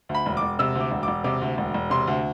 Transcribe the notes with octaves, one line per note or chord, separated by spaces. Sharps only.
D2
B5
E1
D6
E1
C3 E6
D2
D6
E1
E1 D6
C3 D6
D2
E1
E1
C3 C6
D2